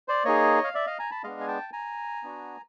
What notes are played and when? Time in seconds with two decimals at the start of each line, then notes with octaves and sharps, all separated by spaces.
0.08 C5 D5
0.25 A#3 D#4 G#4 C#5 D#5
0.64 F5
0.74 D5 E5
0.87 D#5 F5
0.99 G#5 A#5
1.11 A5 B5
1.24 G#3 B3 D4 D#5 F5
1.40 G#5
1.48 G5 A5
1.73 G#5 A#5
2.23 B3 D4 F#4